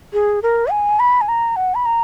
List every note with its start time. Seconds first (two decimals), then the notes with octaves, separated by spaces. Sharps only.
0.13 G#4
0.42 A#4
0.71 G#5
0.99 B5
1.21 G#5
1.28 A#5
1.56 F#5
1.75 B5
1.85 A#5